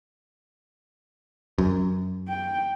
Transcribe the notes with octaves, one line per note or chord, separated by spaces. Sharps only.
F#2
G5